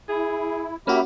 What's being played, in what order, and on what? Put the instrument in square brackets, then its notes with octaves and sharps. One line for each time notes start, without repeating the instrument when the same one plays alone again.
[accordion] E4 [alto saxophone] G#4
[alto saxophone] A#3 [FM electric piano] C#4 F#4 [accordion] G4 E5 B5